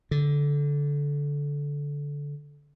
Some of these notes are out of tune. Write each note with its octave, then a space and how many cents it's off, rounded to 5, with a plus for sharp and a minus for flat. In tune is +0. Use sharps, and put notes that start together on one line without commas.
D3 -20